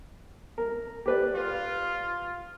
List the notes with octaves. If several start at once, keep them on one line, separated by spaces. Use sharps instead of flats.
A#4
G4 B4 D5
F4